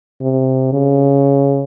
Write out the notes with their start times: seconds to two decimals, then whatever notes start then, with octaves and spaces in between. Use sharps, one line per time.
0.22 C3
0.73 C#3